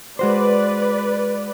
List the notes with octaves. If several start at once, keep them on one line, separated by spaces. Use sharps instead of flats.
G#3 F#4 B4 C5 D5